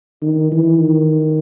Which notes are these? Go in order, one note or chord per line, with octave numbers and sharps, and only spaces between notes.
D#3
E3
D#3